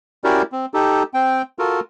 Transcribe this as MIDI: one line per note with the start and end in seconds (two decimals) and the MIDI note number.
0.24 0.42 61
0.24 0.42 64
0.24 0.42 66
0.24 0.42 67
0.24 0.42 70
0.24 0.42 74
0.52 0.66 60
0.74 1.03 63
0.74 1.03 67
0.74 1.03 69
1.14 1.42 60
1.14 1.42 79
1.59 1.80 65
1.59 1.80 66
1.59 1.80 69
1.59 1.80 70